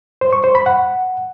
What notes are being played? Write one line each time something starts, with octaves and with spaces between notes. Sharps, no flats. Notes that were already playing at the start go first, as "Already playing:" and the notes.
C5
C#6
C5
B5
F#5